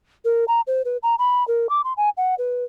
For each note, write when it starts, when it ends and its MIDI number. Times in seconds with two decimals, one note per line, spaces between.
0.25 0.45 70
0.48 0.61 82
0.67 0.82 72
0.85 0.97 71
1.03 1.15 82
1.18 1.46 83
1.48 1.67 70
1.69 1.82 86
1.84 1.93 84
1.97 2.09 80
2.17 2.35 78
2.38 2.64 71